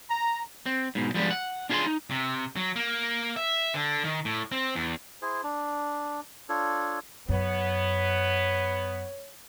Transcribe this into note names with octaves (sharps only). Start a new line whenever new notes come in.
A#5
C4
G#2 B2
F3 G3 G#3 B3 D4
F#5
D4 F4 G#4 C5 A5 C6
D#4
C3
F#3
A#3
E5
D3
D#3
A2
C4
E2
E4 G#4 C5
D4
D4 F4 A4 C#5
F#2 B3 C#5